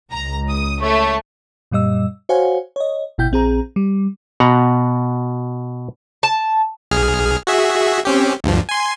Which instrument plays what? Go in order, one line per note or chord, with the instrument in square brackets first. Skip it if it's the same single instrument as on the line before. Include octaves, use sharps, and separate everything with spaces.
[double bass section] C#2 [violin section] A#5
[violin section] D#6
[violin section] A3 [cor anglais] C#5
[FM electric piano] F#2 A#2 G3 D#5 E6
F#4 C5 C#5 F5 F#5 G#5
C#5 D#5
G#1 B2 E4 G5 G6
A#1 C4 G#4 A#5
G3
[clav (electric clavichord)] B2 F#5 A#5
[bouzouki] A5
[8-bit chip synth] B1 G#4 F6
F#4 G#4 E5
C4 C#4 G4
D2 G2 F3
G#5 C6